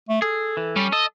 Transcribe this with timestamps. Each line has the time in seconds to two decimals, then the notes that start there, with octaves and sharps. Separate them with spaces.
0.09 A3
0.22 G#4 A4
0.57 E3
0.76 G3 C#4
0.92 A4 D#5